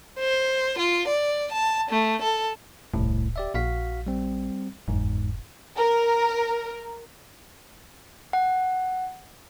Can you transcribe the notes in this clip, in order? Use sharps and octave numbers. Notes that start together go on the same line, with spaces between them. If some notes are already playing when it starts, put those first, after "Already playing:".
C5
F4
D5
A5
A3
A4
D#1 C2 A2
G4 D5 E5
A#1 F#4 F5 B6
G3 C4
F#1 E2 G#2
A#4
F#5